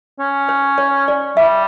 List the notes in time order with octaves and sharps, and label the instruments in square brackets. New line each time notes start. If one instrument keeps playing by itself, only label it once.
[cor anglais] C#4
[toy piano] C5
C#5
D5
[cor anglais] G3 [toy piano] E5